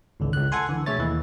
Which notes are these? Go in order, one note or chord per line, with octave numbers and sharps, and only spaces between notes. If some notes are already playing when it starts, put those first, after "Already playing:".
G#1 C#2 D3
C#2 F#6
A4 F#5 G#5 C6
D3 E3
B2 A3 G#4 C#5 E5 A6
D#2 E3